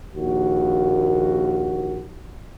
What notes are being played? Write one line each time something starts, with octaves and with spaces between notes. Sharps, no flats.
A#1 D#2 F#4